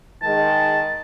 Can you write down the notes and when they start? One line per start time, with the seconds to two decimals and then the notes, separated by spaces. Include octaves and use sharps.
0.23 D#3 G#3 A5